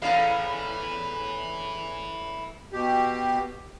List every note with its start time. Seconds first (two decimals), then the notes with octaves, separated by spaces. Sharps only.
0.02 E2 A2 C#4 B4 E5 F5
2.73 B2 G4